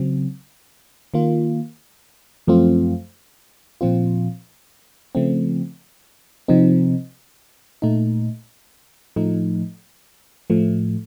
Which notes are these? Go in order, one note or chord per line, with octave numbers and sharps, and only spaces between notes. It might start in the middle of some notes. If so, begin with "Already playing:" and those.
Already playing: C#3 F#3 C4
D#3 A#3 F4
F#2 F3 A3 C4 F4
A#2 F3 C4 F4
C#3 F3 A3 C4
C3 F3 C4 D#4
A#2 A3 D#4
A2 F3 A3 D#4
A2 F3 A3